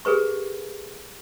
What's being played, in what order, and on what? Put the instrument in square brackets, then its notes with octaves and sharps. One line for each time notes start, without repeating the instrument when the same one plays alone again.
[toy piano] G4 G#4 A#4 B4 C#6